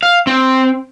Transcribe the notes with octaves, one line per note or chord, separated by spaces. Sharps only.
F5
C4